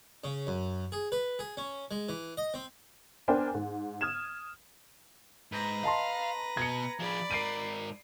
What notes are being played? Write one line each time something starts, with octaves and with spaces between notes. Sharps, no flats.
C#3
F#2
G#4
B4
G#4
C#4
G#3
E3
D#5
C4
B3 D4 A#4 C5 G5 G#5
G#2
D#6 F6 G#6 E7
G#2 B4 A#5
D#5 F5 A5 C6
B2 G#6 C#7
F3 G#4 D5 B5
G#2 A#4 C7 D7 D#7